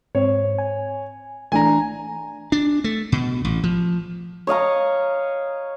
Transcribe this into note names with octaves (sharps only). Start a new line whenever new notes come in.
G#2 C4 C#5
G#5
E3 A3 D4 G#5 A#5
D4
A3
B2
A1
F3
C#5 D#5 F5 A#5